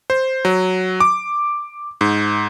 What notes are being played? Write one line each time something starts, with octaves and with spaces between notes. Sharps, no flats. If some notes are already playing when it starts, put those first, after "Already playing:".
C5
F#3
D6
G#2